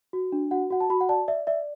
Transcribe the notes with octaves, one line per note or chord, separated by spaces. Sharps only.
F#4
D4
F#4 F#5
F#4 F#5
A5
F#4 B5
F#5
D5 A5
D5 E5
D5 E5